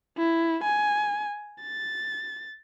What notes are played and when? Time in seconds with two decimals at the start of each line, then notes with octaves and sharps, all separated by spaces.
0.18 E4
0.64 G#5
1.63 A6